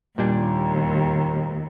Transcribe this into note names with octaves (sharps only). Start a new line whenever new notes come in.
D#2 A#2 G3 D4